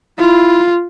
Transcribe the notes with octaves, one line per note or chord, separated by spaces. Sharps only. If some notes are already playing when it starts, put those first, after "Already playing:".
E4 F4